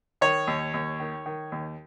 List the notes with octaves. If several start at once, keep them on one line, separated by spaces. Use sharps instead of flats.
D#3 C#5
D#2
D#2
D#3
D#3
D#2